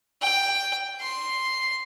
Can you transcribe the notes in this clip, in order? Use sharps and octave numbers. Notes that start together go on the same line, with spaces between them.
G5
C6